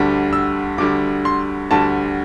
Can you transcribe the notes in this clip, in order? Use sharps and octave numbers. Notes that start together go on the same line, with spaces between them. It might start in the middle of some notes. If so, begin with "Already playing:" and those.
Already playing: D2 D3 G3
E6
D2 D3 G3 D6
C6
D2 D3 G3 A5